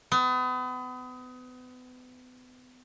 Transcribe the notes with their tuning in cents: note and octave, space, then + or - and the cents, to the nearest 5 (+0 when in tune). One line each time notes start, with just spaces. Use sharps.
B3 +35